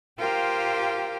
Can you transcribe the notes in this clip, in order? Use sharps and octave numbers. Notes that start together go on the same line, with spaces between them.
F4 G4 A#4 C5 F5 G5